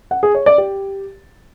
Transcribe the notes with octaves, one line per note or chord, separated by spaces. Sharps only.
F#5
G#4
C#5
D5
G4